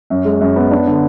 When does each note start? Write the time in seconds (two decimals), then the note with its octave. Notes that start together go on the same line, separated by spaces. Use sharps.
0.10 F#2
0.25 G#3
0.41 F#2
0.56 B3
0.71 D4
0.87 D3